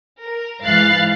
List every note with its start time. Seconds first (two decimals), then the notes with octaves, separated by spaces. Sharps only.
0.22 A#4
0.64 G#2 E3 F5 F#6 A6 C7